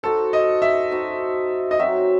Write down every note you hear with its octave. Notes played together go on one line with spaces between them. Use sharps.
D#4 F#4 A4 C5
D#5
E5
D#4 F#4 C5
D#5
F#3 C4 D#4 F#4 E5